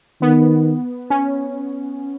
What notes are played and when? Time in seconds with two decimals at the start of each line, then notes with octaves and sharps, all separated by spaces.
0.22 D#3 B3
1.10 C#4